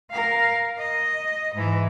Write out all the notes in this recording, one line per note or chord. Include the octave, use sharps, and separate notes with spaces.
A#4 F5
D#5
G#2 E3